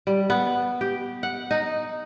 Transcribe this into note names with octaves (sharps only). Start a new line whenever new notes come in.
G3
B3
G4
F#5
D#4